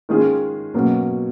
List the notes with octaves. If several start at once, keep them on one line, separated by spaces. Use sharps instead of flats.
D#3 G#3 C#4 F4 G#4
B2 F#3 A#3 C#4